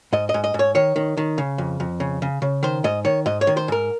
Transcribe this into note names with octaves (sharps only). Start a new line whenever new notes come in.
G#2 D#5
D#5
G#2
D#5
G#2
C#5
D#3 C#5
D#3
D#3
C#3
F2
F2
C#3
C#3
C#3
D#3 C5
G#2 D#5
D#3 C#5
G#2 D#5
C#5
D#3
C5
G#2 A#4